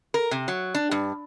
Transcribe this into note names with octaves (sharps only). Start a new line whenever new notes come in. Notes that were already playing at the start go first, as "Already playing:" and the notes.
A#4
C3
F#3
D4
G2